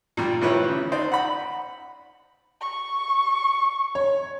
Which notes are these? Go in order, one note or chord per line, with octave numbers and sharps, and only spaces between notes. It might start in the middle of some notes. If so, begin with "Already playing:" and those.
A#2 G3
G#1 F3 G3 E4 B4 C#5
C#3
D#4 C5 D5
F#5 B5
C#6
C#5